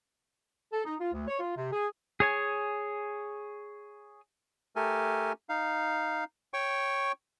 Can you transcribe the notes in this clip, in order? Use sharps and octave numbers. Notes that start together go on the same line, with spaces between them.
A4
D#4
F4
D2
C#5
F4
C3
G#4
G#4 C#5 G#5
A3 G4 A4 A#4 G#5
D#4 F5
C#5 G5 C#6